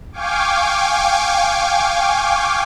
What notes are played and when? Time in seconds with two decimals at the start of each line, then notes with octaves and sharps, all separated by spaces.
0.12 F5 G5 G#5 C#6 D6